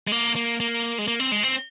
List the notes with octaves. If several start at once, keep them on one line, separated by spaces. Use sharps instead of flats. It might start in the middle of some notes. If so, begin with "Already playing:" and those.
G#3
A#3
A#3
A#3
G#3
A#3
C4
G#3
C4